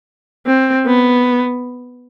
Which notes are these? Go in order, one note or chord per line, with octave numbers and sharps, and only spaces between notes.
C4
B3